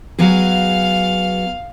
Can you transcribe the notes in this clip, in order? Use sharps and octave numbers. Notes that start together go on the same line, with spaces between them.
F#3 B3 G#4 F5